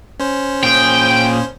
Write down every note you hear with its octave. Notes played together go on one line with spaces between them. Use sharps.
C#4 C5
A#2 G#4 G5